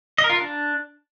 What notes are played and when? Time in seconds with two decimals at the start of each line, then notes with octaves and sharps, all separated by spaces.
0.18 D#5
0.24 A#4
0.30 F4
0.35 A#4
0.41 D4